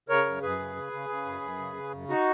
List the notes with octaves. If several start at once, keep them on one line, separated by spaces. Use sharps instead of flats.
C#3 A#4 C#5
F#2
F#2 G#4 B4
C#3
C#3
C#3
C#3
F#2
F#2
C#3
C#3
F#2
D#4 F#4